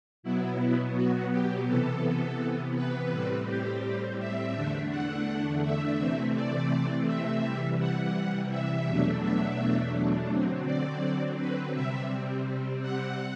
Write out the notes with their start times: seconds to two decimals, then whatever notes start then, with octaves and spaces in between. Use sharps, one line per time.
0.23 B2 F#3 B3 E4
0.95 F#4
1.31 G4
1.67 C3 E3 B3 A4
2.75 B4
3.11 A2 G3 C4
3.47 G4
4.19 E5
4.55 E2 D3 A3 D4
4.90 F#5
5.63 E5
5.99 C3 E3 A3 C4
6.35 D5
7.06 E5
7.43 C3 E3 G3
7.79 F#5
8.50 E5
8.86 E2 B2 F#3 A3 D4
9.22 E5
10.30 D3 F#3 C4
10.66 D5
11.38 B4
11.74 C3 G3 C4 E5
12.82 F#5